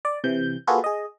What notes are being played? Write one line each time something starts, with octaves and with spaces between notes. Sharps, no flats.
D5
C3 E3 G6
A#3 F4 F#4 G#4 A4 B4
G#4 D#5